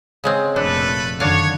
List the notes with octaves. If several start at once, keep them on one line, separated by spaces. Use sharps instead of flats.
C#3 G#3 C4
F1 A#2 A3 D4 A4 B4
F#2 D3 D#3 D4 C#5 F5